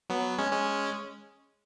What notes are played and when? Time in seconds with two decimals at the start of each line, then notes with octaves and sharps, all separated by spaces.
0.10 F#3 B3
0.38 G#3 C#4
0.52 G#3 C#4